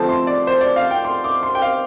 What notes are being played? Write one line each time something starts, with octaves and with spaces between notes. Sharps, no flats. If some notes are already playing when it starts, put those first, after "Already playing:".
Already playing: D3 F3 A3 C4 A5
C6
D5
C5
D5
F5
G5
C6
D6
C6
G5
F5